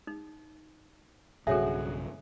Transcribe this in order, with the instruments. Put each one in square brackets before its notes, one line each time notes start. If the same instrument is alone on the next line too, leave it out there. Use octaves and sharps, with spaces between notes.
[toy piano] D#4
[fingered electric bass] B1 G2 C#3 [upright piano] F#4 G#4 [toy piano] A4 C#5 E5